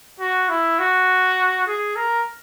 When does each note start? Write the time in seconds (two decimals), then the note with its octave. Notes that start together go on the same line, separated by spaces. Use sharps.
0.20 F#4
0.49 E4
0.79 F#4
1.67 G#4
1.96 A#4